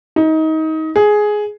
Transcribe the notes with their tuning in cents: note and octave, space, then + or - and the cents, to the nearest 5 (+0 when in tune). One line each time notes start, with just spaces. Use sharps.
D#4 +25
G#4 +10